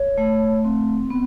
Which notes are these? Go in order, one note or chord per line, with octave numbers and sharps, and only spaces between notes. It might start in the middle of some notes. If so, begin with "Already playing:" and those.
Already playing: C#5
A3
C4
B3